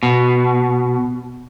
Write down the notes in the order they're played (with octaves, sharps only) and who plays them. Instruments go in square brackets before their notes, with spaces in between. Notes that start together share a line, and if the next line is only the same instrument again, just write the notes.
[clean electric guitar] B2